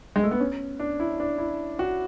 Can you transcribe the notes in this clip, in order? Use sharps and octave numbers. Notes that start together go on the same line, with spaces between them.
G#3
A3
B3
C#4
D4
E4
D4
E4
F#4